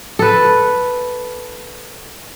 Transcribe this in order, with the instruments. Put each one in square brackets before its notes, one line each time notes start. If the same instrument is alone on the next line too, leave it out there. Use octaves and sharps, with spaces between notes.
[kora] A4 B4